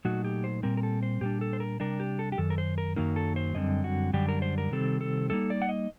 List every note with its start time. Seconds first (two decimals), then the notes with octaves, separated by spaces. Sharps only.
0.05 A#2 F#3 A3 D#4 F#4
0.24 G4
0.44 C5
0.63 A#2 G3 C4 A#4
0.77 A#4
0.83 A4
1.03 C5
1.21 A#2 G3 D4 G4
1.41 A4
1.53 C5
1.60 A#4
1.80 C3 G3 D4 A#4
2.00 G4
2.19 A4
2.32 G4
2.38 F#2 D#3 A4
2.50 A#4
2.58 C5
2.78 A#4
2.96 F#2 D#3 F#3 A#3 D#4 A#4
3.16 A4
3.36 C5
3.55 F#2 D3 G3 C4 D#5
3.84 F#4
4.13 F#2 D3 G3 D4 G4
4.29 A#4
4.42 C5
4.58 A#4
4.71 C3 D#3 G3 C4 A4
5.01 A4
5.30 A2 G3 A#3 D#4 A4
5.50 D5
5.62 F#5
5.69 D#5